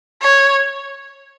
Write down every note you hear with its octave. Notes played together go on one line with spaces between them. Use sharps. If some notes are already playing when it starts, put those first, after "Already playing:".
C#5